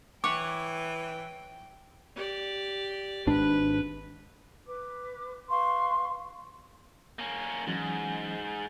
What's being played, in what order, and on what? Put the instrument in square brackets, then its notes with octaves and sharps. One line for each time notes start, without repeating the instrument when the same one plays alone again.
[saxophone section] E3 [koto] C#5 F#5 [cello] G5 [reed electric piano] D6
[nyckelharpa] G4 D5
[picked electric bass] G#1 G#2 D4 [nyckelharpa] B4
[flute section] B4 D6
B4 F5 C6 C#6
[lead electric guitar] A#3 C#4
[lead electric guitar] G#2 [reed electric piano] E3 F#3 C#4